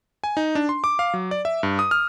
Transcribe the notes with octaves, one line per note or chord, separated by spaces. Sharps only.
G#5
D#4
D4
C6
D6
F5
F#3
D5
E5
G2
D#6
F6